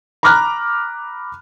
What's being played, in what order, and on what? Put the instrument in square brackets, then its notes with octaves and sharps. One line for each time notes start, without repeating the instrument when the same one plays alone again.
[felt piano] A#5 B5 D6 F6 F#6